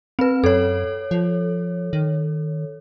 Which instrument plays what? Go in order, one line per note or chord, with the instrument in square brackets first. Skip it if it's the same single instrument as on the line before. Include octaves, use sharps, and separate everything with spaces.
[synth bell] C4 B4
[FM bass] F#2 [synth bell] A4 C#5
[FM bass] F3
D#3